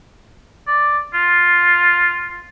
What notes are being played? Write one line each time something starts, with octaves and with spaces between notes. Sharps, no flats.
D5
F4